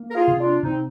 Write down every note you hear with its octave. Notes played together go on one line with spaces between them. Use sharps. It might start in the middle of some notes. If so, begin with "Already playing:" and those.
Already playing: A#3
A#4
F4 G#4
C3
D4 F4
C3 C4 D#4